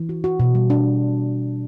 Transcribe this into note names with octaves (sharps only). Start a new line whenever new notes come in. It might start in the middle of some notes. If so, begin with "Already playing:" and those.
Already playing: E3
F#4
F#4
B2
G3
D4